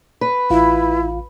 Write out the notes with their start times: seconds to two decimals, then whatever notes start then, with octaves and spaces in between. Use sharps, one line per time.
0.21 B4
0.50 A1 E4 F4 F5